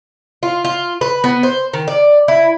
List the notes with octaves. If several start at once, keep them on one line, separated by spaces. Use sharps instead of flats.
F4
F4
B4
B3
C5
D#3
D5
E4